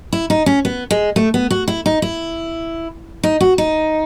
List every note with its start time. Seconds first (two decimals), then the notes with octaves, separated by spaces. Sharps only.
0.13 E4
0.30 D#4
0.46 C#4
0.65 B3
0.91 G#3
1.16 A3
1.34 B3
1.50 F#4
1.68 E4
1.86 D#4
2.02 E4
3.23 D#4
3.41 F#4
3.58 D#4